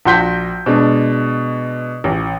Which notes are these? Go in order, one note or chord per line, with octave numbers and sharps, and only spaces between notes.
A#1 F#4 C6 G6 B6
B2 G#3 D4
A1